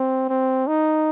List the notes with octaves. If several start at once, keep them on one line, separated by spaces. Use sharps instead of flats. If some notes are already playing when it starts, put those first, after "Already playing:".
Already playing: C4
C4
D#4